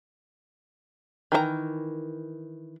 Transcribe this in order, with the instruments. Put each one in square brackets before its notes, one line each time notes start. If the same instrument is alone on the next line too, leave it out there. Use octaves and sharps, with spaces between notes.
[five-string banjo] D#3 E3 F4 A#5